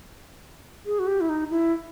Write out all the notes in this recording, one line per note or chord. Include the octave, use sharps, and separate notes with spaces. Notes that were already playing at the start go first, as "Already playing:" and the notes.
G#4
F#4
G4
E4
D#4
E4